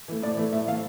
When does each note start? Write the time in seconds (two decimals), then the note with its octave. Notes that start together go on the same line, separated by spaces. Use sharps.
0.08 E3 A3
0.22 A2 D5
0.37 E3 A3
0.52 A2 E5
0.67 E3 A3 F5